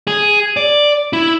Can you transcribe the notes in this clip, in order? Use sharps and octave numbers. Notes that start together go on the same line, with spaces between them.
G#4
D5
E4